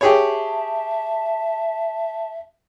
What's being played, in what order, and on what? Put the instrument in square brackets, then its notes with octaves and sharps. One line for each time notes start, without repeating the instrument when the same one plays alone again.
[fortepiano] G4 G#4 C#5 [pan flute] E5 [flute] A5